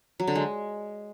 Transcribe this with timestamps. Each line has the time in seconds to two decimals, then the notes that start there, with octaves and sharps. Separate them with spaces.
0.20 F#3
0.27 D3
0.35 G#3